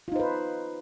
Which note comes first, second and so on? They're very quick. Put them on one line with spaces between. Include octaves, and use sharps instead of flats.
F4 D#4 C5 B4